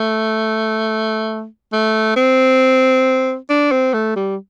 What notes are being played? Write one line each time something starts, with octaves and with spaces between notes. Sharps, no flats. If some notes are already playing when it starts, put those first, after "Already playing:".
Already playing: A3
A3
C4
D4
C4
A3
G3